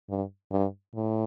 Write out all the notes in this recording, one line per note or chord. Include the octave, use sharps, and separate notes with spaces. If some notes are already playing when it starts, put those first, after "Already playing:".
G2
G2
A2